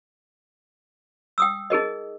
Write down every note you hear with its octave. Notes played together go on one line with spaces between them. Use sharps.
G5 D#6 E6
D#4 G#4 A#4 D#5